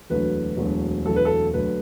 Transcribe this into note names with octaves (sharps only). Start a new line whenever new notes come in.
E1 D2 D3 F#3 B4
E1 D2 D3 F#3
E1 D2 D3 F#3 A4
B4
A4
D2 D3 F#3 B4